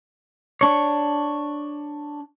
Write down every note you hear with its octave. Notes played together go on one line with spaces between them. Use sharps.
D4 C#5